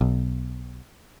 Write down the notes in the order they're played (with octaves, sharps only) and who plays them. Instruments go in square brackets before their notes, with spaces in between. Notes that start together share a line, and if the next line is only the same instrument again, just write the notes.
[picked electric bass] B1